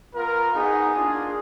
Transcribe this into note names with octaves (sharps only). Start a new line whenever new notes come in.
B3 F4 A#4
B3 D#4 F#4 G#4
A#3 D4 F4